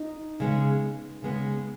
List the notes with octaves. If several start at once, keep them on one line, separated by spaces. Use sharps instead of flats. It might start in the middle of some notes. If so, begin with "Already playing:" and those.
Already playing: D#4
C#3 G#3 B3
C#3 G#3 B3